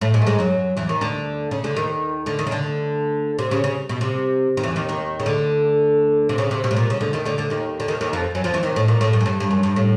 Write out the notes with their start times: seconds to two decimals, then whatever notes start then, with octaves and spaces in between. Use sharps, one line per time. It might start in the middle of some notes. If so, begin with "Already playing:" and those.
0.01 A2 A3
0.14 G#2 G#3
0.22 A3
0.27 G#2 G#3
0.39 F#2 F#3
0.77 E2 E3
0.89 D#2 D#3
1.01 D2 D3
1.51 C#3
1.64 D2 D3
1.77 D#2 D#3
2.26 D2 D3
2.39 D#2 D#3
2.47 C#3
2.51 D2 D3
3.39 C3
3.51 C#3
3.64 C#3
3.89 B2
4.01 C3
4.57 D#3
4.63 E2 E3
4.76 D#2 D#3
4.89 D#2 D#3
5.20 C#3
5.26 D2 D3
6.29 C3
6.38 C#3
6.51 C3
6.64 B2
6.71 A2
6.77 A#2
6.90 C#3
7.01 D2 D3
7.13 D#2 D#3
7.25 D2 D3
7.38 D2 D3
7.50 D#2 D#3
7.80 D3
7.88 D#2 D#3
8.01 D#2 D#3
8.13 F2 F3
8.35 F#2 F#3
8.44 F2 F3
8.54 E2 E3
8.63 D#2 D#3
8.76 A2
8.88 A#2
9.01 A2
9.13 G2
9.20 F#2
9.26 G2
9.40 G2
9.51 F#2
9.63 G2
9.76 A2